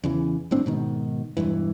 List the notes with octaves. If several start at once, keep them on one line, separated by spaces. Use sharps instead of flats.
E2 C#3 E3
G1 A2 C4 D4
G#2 B2 D#3
E1 C2 G2 E3